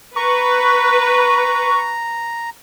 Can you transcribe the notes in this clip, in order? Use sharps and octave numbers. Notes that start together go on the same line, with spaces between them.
B4 A#5 C#6